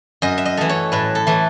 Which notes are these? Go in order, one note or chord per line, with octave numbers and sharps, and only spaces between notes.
F#2 D#5
E5
D#5
E3 A3
C#5
A2 B4
A4
E3 A3